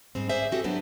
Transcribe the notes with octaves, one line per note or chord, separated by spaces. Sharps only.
G#2 G3 C4
G#4 C5 D5 E5 G#5
C4 F#4 G4 A4
F#3 B3 D4 B4